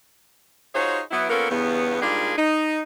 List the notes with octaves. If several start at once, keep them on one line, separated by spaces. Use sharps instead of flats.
D#4 F4 F#4 G#4 C5 C#5
F#3 B3 E4
A#3 B3 C#4 F4 A4 A#4
E2 G2 C#3 B3
G#2 G3 A#3 D4 F4 G#4
D#4